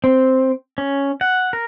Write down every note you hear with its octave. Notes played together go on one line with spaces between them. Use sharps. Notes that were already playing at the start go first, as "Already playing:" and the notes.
C4
C#4
F#5
A#4